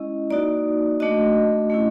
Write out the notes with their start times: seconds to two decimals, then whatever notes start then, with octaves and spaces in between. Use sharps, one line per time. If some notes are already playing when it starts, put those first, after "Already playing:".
Already playing: G#3 C#4 E4 D#5
0.30 A#3 D#4 F#4 D5
1.00 A3 D4 F#4 D#5
1.70 A3 C#4 E4